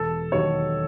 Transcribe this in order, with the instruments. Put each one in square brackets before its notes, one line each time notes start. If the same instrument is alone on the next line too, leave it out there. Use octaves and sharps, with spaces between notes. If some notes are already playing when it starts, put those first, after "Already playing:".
Already playing: [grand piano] E1 A4
D#2 D#3 F#3 C#5